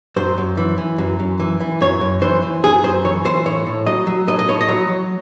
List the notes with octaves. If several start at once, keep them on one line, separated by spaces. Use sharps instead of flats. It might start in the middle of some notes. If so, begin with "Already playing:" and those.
F#2 C5
F#2
E3
E3
F#2
F#2
E3
E3
F#2 C#5
F#2
E3 C5
E3
F#2 G#4
F#2 C5
E3 C#5
E3 C5
A2 C#5
A2
F#3 D#5
F#3
A2 D#5
D#5
A2 C#5
D#5
F#3 C#5
F#3